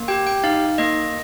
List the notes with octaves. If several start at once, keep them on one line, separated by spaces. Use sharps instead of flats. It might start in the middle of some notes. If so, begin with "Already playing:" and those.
Already playing: A#3
G4 G5
G5
D#4 F5
A#3 D#5